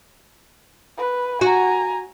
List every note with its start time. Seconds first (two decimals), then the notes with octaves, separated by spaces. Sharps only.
0.97 B4
1.41 F#4 G#5 A#5